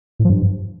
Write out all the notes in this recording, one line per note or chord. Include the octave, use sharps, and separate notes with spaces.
A2
F3
G2